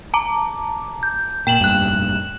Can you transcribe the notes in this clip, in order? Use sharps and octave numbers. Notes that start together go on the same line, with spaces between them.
A5 A#5 D6
G6
A#2 G5 E7 F#7
F1 G2 A#2 F#6 E7 F#7